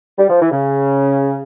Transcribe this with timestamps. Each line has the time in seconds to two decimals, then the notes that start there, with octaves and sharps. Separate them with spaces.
0.19 G3
0.30 F3
0.41 E3
0.51 C#3